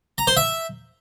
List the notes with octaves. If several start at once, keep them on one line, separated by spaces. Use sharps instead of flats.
A#5
C5
E5